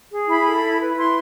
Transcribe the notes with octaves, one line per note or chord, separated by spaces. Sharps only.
G#4
E4 B5
A4
E4
B4
E4 C6